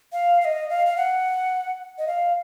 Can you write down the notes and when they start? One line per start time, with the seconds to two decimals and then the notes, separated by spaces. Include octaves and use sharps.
0.13 F5
0.41 F5
0.45 D#5
0.70 F5
0.86 F5
0.97 F#5
1.98 D#5
2.07 F5